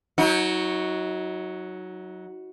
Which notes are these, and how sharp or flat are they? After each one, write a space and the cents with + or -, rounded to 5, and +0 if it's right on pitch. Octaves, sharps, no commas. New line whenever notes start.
F#3 +0 D#4 +40